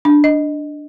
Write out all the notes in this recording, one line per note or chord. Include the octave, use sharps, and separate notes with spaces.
D4
D#5